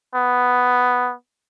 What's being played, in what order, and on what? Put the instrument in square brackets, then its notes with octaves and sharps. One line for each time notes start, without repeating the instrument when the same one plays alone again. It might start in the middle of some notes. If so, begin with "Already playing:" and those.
[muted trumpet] B3